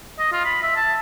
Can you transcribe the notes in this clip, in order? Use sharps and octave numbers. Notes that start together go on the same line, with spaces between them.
D#5
F4
B5
E5
A5